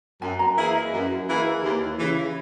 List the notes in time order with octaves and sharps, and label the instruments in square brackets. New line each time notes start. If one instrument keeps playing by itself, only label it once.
[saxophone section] F#2 [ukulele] G#5
[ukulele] A#5
[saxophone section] E3 A#3 E4 G#4
[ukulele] D#5
[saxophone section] F#2
E3 A#3 E4 G#4
D#2
C#3 E3